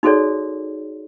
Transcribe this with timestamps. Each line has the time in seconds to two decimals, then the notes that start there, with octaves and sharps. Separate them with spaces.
0.03 D#4 F#4 G#4 A4 C#5 D5